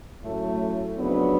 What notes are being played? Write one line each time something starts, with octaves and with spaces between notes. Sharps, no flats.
A2 F#3 A3 C#4
F2 C#3 F#3 B3 D4